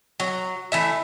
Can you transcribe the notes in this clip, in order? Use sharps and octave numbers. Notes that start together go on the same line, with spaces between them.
F#3
E3 A3 E5